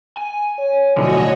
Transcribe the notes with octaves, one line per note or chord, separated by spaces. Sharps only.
G#5
C#5
B1 A2 D3 F3 F#4 C#5 D#5